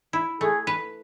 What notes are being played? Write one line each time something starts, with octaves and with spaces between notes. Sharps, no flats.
E4
A3 G#4
B4